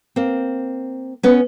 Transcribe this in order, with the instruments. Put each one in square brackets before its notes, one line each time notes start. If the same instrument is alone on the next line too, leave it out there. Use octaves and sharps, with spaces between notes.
[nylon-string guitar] A#3 C4
B3 C#4